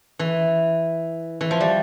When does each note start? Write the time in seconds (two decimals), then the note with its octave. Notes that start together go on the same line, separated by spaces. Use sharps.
0.19 E3
1.41 E3
1.51 F3
1.60 G3